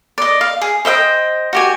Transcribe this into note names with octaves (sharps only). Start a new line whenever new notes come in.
D5 D#5
F5
G#4
C5 D#5 E5 G5
F#4 G4 G#5